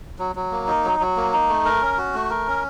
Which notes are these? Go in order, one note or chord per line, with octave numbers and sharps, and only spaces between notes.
F#3
F#3
A#3
D#4
F#3
F#3
A#3
D#4
A3
A#4
C#4
F#4
A3
A#4
C#4